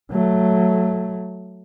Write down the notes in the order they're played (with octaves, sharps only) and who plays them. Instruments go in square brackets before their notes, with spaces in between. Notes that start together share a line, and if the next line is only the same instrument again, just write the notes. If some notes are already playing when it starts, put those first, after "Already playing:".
[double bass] F#3 A3